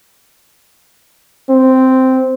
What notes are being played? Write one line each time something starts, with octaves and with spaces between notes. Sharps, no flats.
C4